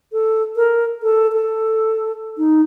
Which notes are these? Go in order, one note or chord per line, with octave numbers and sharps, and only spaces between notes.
A4
A#4
A4
A4
D#4